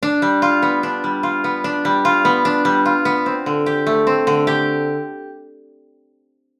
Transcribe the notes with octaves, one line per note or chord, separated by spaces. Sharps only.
D4
G3
F4
B3
D4
G3
F4
B3
D4
G3
F4
B3
D4
G3
F4
B3
C4
D3
G4
A3
C4
D3
G4